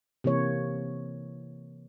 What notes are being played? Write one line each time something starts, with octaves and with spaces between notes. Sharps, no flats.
C3 E3 A#3 C#5